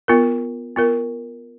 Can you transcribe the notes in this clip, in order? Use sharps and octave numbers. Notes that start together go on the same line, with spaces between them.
B3 F4 A#4
B3 F4 A#4